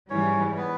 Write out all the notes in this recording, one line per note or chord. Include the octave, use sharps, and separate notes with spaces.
G#2 E3 G3 C#4 C#5
B3 B4